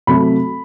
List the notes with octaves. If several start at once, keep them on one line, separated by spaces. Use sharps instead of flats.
C3 F#3 A3 B5